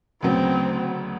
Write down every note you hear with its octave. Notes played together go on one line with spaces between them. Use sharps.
D2 C#3 F#3 B3 C4